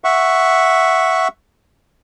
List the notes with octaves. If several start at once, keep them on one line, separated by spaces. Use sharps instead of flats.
E5 F#5 C#6